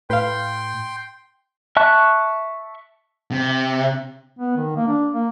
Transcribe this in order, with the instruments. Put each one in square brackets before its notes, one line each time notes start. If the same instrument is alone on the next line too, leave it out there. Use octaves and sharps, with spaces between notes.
[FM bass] A2 [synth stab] B4 F5 [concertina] G5 C6
[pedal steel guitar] E5 A5 C#6 F#6
[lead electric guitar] C3
[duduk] B3
D#3
A#3
D4
A#3